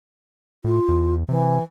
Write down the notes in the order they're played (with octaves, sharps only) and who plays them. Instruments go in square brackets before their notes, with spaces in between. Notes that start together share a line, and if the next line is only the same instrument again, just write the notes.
[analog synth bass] A2 [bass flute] F4
[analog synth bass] E2
[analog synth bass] C3 [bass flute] E3